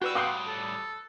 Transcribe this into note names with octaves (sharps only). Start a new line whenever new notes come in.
F#4 G4 B4 D5 F#5 E6
A2 G3 F5 G5 C6 D6 D#6 F#6
A4